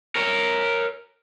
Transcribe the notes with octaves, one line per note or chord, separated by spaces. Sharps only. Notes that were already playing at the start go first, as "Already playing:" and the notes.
A#4 C#5